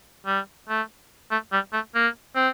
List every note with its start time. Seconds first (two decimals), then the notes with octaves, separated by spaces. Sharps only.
0.27 G3
0.69 A3
1.31 A3
1.52 G3
1.73 A3
1.95 A#3
2.36 C4